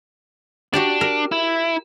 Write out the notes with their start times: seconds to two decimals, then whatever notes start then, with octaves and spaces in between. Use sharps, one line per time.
0.74 D4 F#4 G4 D5
1.01 A#4
1.32 E4